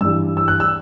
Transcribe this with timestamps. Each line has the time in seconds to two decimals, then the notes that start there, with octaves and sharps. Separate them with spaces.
0.01 G2 E3 G3 E6
0.37 E6
0.48 F#6
0.60 E6